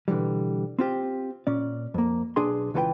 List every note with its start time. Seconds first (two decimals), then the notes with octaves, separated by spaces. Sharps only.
0.08 B2 D3 E3 G3
0.79 C4 F4 G4
1.47 A#2 C#4 D5
1.94 F2 A#3
2.36 B1 D4 G#4 G#5 C6
2.74 C#2 E3 F4 A4 B4 G5